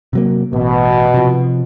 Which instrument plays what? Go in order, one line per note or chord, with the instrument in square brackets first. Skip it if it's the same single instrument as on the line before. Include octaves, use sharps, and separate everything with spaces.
[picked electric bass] C3 F#3 A#3
[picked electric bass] A1 [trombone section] B2
[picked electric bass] C3 F3